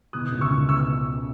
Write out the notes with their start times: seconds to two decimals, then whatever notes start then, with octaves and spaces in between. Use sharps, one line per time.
0.13 B2 D#6 F#6
0.32 C#2
0.41 C#6 E6
0.50 C#2
0.69 B2 C#6 E6